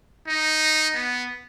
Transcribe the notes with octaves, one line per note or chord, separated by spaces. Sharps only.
D#4
B3